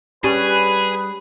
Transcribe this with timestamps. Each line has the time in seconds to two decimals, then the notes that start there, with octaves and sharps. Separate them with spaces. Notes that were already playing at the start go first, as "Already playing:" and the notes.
0.24 G3 C#4 G#4 B4